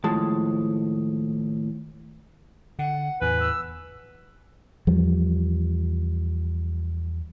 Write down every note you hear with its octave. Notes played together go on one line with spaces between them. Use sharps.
D#2 A2 F3 G#3 A5
D3 F#5
E2 A2 B4 G#5
E6
E2 F3 G3